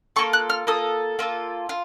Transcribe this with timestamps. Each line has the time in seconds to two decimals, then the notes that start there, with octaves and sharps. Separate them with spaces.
0.16 A#3 F4 A4 C#6
0.33 F#6
0.50 F6
0.67 A#3 F4 A4 D#6
1.19 A#3 F4 A4
1.69 F4